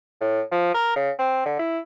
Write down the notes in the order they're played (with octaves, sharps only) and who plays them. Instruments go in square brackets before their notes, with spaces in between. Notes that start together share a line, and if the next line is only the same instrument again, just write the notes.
[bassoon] A2
F3
A#4
C#3
C4
D3
E4